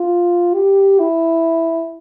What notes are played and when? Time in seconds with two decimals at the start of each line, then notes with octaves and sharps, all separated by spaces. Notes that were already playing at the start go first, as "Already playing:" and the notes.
Already playing: F4
0.54 G4
0.99 E4